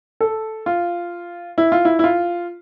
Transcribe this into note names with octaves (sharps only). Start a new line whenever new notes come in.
A4
F4
E4
F4
E4
E4
F4